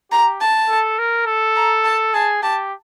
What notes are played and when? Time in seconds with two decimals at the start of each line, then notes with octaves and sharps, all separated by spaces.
0.11 G4 A#5
0.40 A5
0.68 A4
0.99 A#4
1.26 A4
1.55 A#5
1.84 A5
2.14 G#4 A5
2.43 G4 A5